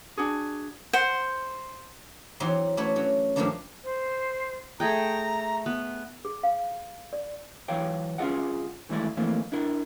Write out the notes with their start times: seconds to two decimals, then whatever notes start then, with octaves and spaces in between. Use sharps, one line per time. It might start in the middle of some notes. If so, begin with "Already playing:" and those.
0.17 D4 F#4 G#4
0.93 C5 F#5
2.40 E2 F#3 C4 D#4 F#5 C6
2.77 A3 C#4 E4 F#4 B4 C#5
2.96 F#3 C#4
3.36 G2 D#3 F3 A3 A#3 D4
3.84 C5
4.80 A3 G#4 G5 A#5
5.66 B3
6.25 G#4
6.43 F5
7.13 D5
7.68 E3 F#3 C#5 F5 G5
8.18 C2 C#4 F4 G#4 D#5 F#5
8.89 D#2 E3 G#3 A3 E4 D5
9.17 F2 E3 A3 A#3 C4
9.52 D4 E4 A#4